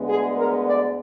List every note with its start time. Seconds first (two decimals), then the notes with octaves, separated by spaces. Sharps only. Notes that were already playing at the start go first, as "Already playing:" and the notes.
Already playing: D2 D3 G#3 B3
0.09 G#4
0.38 A#4
0.67 D5